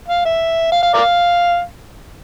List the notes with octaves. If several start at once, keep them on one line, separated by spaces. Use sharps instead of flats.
F5
E5
F5
F5
A#4 D5 F5